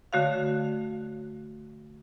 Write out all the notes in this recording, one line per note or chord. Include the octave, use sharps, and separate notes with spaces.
D3 A3 F#4 C#5 F5